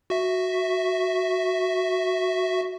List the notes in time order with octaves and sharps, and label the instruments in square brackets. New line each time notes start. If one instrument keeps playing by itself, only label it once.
[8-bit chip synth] F#4 E5